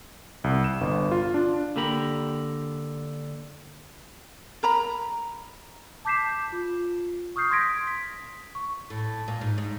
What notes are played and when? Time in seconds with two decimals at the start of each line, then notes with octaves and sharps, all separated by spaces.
0.44 C2
0.64 E7
0.81 G1
1.11 F4
1.34 D4
1.76 D3 A#3 G4 A#4 B5
4.63 A#4 A#5 B5
6.05 A5 D6 G6 B6 C7 E7
6.52 F4
7.36 C#6 D#6 F6 G6 C7
7.51 C6 D#6 G#6 A#6 B6 D7
7.87 B6
8.55 C#6
8.90 A2
9.28 A#2
9.41 G#2
9.58 G#2